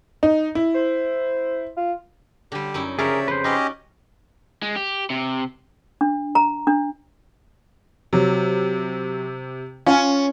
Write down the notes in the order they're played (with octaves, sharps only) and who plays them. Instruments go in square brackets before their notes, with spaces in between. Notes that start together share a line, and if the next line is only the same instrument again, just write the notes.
[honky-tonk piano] D#4
E4
[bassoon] C5
F4
[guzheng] D3 G3 [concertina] G4
[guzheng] F#2 D#4 E4
[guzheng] C#3 F3 G4 [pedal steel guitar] G#4 A#4 [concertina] C#5 D5 E5
[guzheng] F2 [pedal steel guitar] B4 C5
[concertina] C#4 G4 D#5 [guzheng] D#4 F#4 D5
[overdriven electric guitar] G#3
G4
C3
[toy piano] D4
A#5
D4
[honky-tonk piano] C3 [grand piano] F#3
[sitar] C#4 [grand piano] F4 G#5